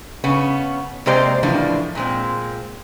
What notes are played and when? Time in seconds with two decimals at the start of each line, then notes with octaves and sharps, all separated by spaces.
0.24 C#3 B3 C#4
1.06 C3 G#3 A#3 G4 C5 D5
1.43 A2 C#3 E3 F3 A#3 D4
1.95 A#2 G#3 C4